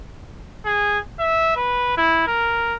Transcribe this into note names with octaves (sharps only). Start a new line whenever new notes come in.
G#4
E5
B4
E4
A#4